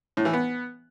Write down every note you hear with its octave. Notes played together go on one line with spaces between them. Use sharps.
A2
E3
B3